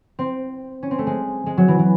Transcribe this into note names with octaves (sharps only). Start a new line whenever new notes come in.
C4
C#4
C4
A3
G#3
G#3
F#3
E3
E3